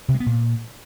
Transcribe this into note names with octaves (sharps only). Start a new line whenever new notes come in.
C3
G#3
B3
A#2